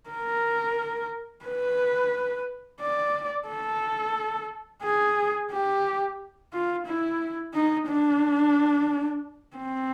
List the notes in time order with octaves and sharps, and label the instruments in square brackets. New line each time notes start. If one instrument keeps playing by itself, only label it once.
[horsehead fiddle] A#4
B4
D5
A4
G#4
G4
F4
E4
D#4
D4
C4